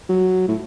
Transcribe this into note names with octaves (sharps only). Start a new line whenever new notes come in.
F#3
A2